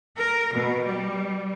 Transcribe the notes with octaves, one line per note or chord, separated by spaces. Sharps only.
A#4
B2
G3